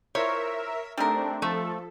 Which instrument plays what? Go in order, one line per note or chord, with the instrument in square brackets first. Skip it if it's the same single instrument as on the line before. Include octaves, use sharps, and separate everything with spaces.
[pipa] E4 F4 C5 [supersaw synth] A#4 E5 [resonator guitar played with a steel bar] C#5
[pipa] G3 D#4 A#4 [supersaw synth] A3 C4 D4
[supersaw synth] F3 A4 [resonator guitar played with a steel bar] A3